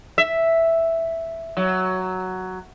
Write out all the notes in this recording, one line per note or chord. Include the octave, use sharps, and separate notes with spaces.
E5
F#3